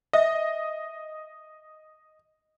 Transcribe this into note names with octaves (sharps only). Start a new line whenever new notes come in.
D#5 E5